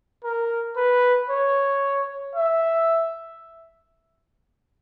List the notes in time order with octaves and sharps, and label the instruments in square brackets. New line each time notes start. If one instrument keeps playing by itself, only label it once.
[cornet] A#4
B4
C#5
E5